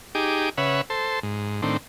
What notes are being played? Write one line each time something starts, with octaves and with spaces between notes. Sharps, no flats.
D#4 G4 G#4 D6
C#3 B4 C#5 E5 F#5
A4 C5
G#2
A2 D#3 C4 D4